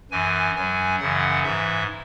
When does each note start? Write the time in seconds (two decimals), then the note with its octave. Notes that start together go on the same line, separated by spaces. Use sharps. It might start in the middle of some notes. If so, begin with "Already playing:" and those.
0.11 F#2 E3 G#5
0.55 F#2 F#3 G#5
1.00 F#2 C#3 E3 F#5
1.43 G#2 E3 E5